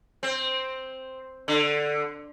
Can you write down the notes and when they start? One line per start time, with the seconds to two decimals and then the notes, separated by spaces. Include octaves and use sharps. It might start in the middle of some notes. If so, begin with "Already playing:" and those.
0.23 C4
1.48 D3